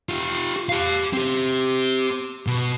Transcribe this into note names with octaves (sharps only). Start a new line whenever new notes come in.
F4 G4
G4 F5
C4 G4
B2